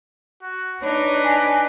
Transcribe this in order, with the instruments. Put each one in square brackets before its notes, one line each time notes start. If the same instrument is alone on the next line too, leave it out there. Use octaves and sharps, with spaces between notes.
[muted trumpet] F#4
[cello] D4 D#4 [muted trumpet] B4 [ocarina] C#5
[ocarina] G#5